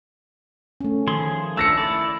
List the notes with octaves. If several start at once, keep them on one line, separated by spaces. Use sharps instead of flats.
A3 C#4
D#3 F3 G#4 C6
A3 D4 E6 A#6 C#7
E4 D5